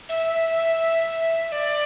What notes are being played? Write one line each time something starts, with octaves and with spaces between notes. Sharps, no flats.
E5
D5